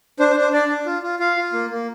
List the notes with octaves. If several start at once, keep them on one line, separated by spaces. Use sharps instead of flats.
D4 C5
C5
D4
C5
D4 D5
D4
F4
F4
F4 F5
F4
A#3
A#3